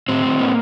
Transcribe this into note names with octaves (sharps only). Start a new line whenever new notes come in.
A2 C4
A2
A#3